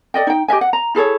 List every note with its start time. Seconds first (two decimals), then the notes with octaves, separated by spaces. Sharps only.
0.14 A4 D5 D#5 G5
0.27 D#4 G5
0.48 G4 D#5 E5 G#5
0.61 F#5
0.73 A#5
0.95 E4 G#4 A4 C#5